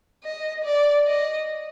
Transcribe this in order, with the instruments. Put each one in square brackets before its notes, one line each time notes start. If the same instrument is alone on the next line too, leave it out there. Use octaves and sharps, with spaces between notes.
[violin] D#5
D5
D#5